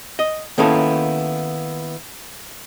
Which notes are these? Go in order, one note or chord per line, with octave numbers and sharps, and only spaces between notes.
D#5
D#3 A#3 B3 C#4 E4 A4